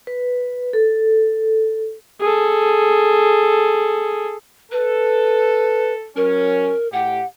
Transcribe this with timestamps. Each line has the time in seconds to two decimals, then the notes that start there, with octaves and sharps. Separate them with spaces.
0.07 B4
0.73 A4
2.21 G#4 A4
4.72 A4 B4
6.17 F#3 C#4 A#4
6.93 A2 G4 F#5